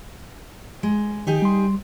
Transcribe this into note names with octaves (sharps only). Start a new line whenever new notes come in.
G#3
D#3 D#4 G4 G#4
G3 C6